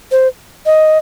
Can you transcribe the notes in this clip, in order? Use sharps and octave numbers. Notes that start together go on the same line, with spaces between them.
C5
D#5